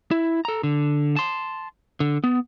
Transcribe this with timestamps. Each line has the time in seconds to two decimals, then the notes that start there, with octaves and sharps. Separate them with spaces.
0.11 E4
0.45 A4 A#5
0.63 D3
1.16 A5 C6
2.00 D3
2.24 B3